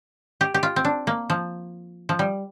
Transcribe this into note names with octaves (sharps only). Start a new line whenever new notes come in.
G4
G4
F4
C4
D4
A#3
F3
F3
G3